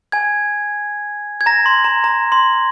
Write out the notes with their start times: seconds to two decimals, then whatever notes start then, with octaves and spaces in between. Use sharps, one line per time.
0.12 G#5 G#6
1.41 G#6
1.46 A#5 A#6
1.66 C6
1.84 A#5
2.04 A#5
2.32 C6